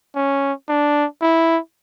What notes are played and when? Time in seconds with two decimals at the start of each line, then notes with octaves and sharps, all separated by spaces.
0.15 C#4
0.69 D4
1.22 E4